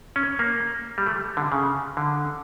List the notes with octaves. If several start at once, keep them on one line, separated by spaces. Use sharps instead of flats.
C#4
A#3
G3
A3
D3
C#3
D3